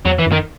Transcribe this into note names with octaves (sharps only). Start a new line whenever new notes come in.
E2 F#3
E3
F#2
D#3